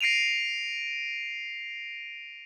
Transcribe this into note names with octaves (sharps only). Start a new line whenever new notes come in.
A#6 C7 D7 D#7 F7